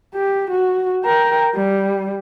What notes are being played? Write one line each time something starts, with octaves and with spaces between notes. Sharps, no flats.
G4
F#4
A#4 G5
G3